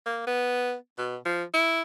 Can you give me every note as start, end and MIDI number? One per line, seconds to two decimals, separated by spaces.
0.06 0.26 58
0.27 0.74 59
0.98 1.17 47
1.25 1.44 53
1.54 1.81 64